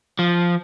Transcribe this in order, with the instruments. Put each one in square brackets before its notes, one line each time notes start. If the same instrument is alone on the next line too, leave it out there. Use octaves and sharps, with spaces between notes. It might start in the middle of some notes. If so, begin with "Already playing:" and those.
[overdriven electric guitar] F3